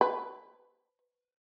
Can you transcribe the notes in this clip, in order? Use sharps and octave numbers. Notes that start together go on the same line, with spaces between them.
B4